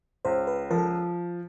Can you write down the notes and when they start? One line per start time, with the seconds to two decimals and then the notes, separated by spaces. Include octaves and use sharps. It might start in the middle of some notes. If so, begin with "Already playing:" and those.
0.25 C#2 C5
0.47 B4
0.70 F3 A#4
0.78 A4